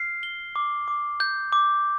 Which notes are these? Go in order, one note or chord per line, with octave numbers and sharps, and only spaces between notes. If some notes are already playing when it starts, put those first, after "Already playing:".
Already playing: F6 C7
G7
D6
D6
G6
D6